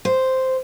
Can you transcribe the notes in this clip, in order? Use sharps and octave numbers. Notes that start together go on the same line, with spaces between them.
C5